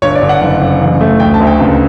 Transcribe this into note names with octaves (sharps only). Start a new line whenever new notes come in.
G1 C#5
D5
G1
F#5
F#1
F#1
A1
A3
D2 G5
A5
D2
G5
C#2